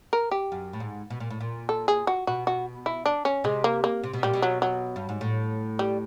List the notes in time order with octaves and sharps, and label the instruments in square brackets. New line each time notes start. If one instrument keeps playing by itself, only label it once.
[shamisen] A#4
G4
[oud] F#2
A2
G#2
B2
A#2
A2
A#2
[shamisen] A4
G#4
F#4
[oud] B2 [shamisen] F#4
[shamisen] F#4
E4
D4
C#4
[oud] C3 [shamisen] G#3
[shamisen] A#3
A#3
[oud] C3
B2
[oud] A#2 [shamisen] G3
[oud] B2
[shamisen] F#3
F#3
[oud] G2
G#2
A2
[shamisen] G3